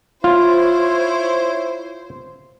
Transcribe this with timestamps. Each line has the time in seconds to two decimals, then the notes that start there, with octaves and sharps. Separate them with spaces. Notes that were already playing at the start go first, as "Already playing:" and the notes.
0.24 E4 F4 C5 C#5